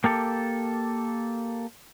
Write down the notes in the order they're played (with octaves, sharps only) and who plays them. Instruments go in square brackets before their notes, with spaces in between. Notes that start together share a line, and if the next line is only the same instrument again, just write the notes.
[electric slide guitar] A#3 G4 A4